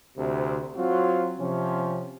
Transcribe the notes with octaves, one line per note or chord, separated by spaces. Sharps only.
D2 C3
F#3 C4 F4 F#4
C3 F3 C#4